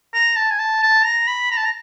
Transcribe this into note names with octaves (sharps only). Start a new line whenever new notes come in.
A#5
A5
G#5
A5
A5
A#5
B5
A#5
A5
A#5